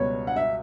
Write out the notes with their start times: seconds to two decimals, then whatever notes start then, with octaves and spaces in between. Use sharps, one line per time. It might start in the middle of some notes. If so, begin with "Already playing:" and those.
Already playing: C#2 B2 G3 B3 C#5
0.27 F#5
0.36 E5